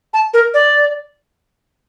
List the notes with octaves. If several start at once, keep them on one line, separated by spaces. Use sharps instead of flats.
A5
A#4
D5